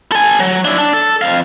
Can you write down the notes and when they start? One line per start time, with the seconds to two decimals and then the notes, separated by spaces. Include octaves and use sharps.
0.12 A4 G#5
0.40 F#3
0.65 D4 E4
0.78 D4
0.93 A4
1.21 F2 F5